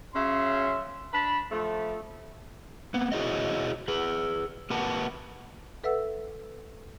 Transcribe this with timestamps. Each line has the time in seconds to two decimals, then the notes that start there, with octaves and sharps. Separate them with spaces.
0.14 C#3 F#3 C#4 E5 C6
1.13 D4 A5 B5
1.51 F3 A3
2.94 A#3 B3
3.12 E4 F#4 G#4 C5 C#5 D#5
3.88 G#4 B4
4.70 A#3 G4 A#4 B4 F#5 A5
5.84 A4 B4 E5 F#5 E6